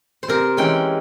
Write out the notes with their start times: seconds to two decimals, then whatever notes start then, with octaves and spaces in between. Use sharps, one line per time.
0.23 C5
0.28 C3 A#4
0.57 E3 G#3 C#4 G5